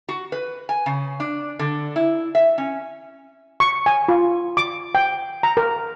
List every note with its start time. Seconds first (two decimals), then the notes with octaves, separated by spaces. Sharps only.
0.09 F#4
0.32 B4
0.69 G#5
0.86 C#3
1.20 D4
1.59 D3
1.96 E4
2.35 E5
2.58 C#4
3.60 C#6
3.86 G#5
4.08 F4
4.57 D6
4.95 G5
5.43 A#5
5.57 A#4